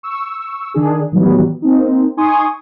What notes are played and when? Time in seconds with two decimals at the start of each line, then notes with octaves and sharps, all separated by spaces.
0.03 C#6 E6
0.74 D3 D#3 D4 G#4
1.12 A2 D#3 E3 F#3 G3 B3
1.62 A#3 C4 D#4
2.17 D#4 G#5 C6 C#6 D#6